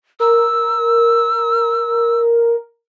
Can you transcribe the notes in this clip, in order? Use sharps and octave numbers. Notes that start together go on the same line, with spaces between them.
A#4 E6